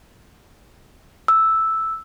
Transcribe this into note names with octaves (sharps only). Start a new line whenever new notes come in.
E6